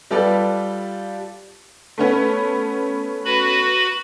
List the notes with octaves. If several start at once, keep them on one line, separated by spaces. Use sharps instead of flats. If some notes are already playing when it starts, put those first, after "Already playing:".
G3 F4 G4 A4 B4 D5
A3 B3 C#4
F#4 B4 B5